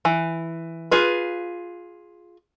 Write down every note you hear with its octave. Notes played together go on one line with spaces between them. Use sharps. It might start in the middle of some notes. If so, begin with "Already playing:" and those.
E3
F4 G#4 B4